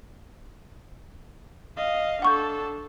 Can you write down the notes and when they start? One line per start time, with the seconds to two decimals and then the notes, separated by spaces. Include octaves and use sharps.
1.77 D#5 F5
2.22 D4 A4 F#5 C#6 G6